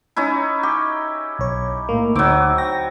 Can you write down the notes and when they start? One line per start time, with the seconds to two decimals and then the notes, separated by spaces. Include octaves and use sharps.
0.16 C#4 D#4 E4
0.63 G4
1.39 B1 C#5
1.89 A2 A#3
2.15 D2 F#3 C4 D#4 D6
2.58 G5 A#6